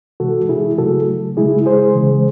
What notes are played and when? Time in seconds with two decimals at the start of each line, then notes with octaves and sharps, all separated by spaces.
0.20 C3 E3 G#3 F#4 A4
0.49 E4 G#4
0.78 C#3 F#3 A3 F#4 A4
1.37 C#3 G#3 E4 G#4
1.66 G#4 C5
1.95 C#3 E3 G#3